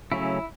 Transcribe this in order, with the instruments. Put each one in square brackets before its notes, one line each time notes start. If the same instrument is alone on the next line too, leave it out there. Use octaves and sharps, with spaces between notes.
[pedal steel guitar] C#3 F#3 A3 C#4 E4